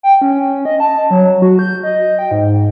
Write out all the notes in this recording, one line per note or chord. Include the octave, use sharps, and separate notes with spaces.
G5
C#4
D#5
A5
F#3
F#4
G6
D#5
G5
G#2